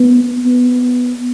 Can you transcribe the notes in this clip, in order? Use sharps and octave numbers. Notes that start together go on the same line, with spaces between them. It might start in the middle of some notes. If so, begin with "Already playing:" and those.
Already playing: B3
B3